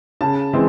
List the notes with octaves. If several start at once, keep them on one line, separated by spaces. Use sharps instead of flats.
C#3 A5
E3 G#3 C4